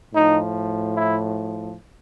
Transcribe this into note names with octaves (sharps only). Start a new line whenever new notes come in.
A2 F3 D#4
E4